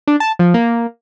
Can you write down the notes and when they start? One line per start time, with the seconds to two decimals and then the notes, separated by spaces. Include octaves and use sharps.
0.07 D4
0.20 A5
0.39 F3
0.54 A#3